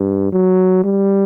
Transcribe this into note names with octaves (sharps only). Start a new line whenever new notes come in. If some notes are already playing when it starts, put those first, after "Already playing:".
Already playing: G2
F#3
G3